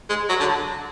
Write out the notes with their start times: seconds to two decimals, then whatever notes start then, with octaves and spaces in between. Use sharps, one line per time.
0.09 G#3
0.29 F#3
0.40 D3